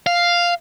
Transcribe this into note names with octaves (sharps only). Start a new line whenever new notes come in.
F5